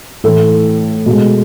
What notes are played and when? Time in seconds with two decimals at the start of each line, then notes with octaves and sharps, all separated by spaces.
0.24 A2 E3 A3 A4
1.06 B2 G#3